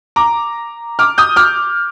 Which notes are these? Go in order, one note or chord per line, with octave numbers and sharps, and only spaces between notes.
A#5 D6
D6 F6
D#6 G6
D6 F6